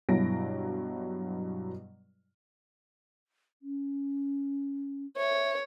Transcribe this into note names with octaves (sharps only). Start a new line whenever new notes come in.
G2 B2 F#3 E4 A#6 D7
C#4
C#5 E5